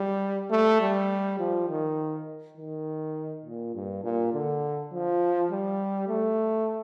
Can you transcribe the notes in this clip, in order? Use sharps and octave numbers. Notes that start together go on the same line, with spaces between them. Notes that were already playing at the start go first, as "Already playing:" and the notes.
Already playing: G3
A3
G3
F3
D#3
D#3
A#2
G2
A#2
D3
F3
G3
A3